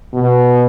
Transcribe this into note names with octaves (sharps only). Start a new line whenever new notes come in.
B2